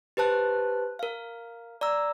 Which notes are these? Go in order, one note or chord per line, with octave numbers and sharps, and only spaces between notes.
G4 B4 C5 A5 F#6
A#4 F5
D5 A#5 E6